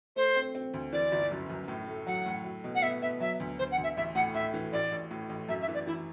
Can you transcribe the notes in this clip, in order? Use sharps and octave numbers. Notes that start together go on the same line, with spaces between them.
A3 C5
C4
C4
D2
E3 D5
G1
F#2
F#2
A2
A3
F#3 F#5
A2
F#3
B2
F#5
B3 E5
B3 E5
F#3 E5
D2
D2 C5
F#5
D2
E5
A1 E5
A2 F#5
A2 E5
E3
A1 D5
A1
A2
A1
F#2 E5
E5
E3
D5
E3 E4